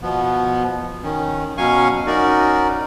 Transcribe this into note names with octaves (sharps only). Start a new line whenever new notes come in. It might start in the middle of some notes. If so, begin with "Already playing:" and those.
B2 F3 B3
D#3 C#4
B2 F#3 C#4 F5 G#5 C#6
C#4 D#4 F#4 A#4 D5